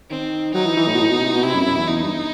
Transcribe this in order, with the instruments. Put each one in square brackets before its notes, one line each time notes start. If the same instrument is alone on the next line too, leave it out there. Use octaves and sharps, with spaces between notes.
[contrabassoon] D#3 [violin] C4
[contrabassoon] F#3 [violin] D#4
[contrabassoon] E3
E3
A2
B2
A2
B2
C3
B2
[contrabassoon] C3 [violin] E4
[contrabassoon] F#2
F#2
E2
[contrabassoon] E2 [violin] D#4
[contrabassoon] G2